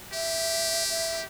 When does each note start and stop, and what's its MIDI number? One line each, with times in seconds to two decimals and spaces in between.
0.13 1.25 67
0.13 0.84 76
0.90 1.21 76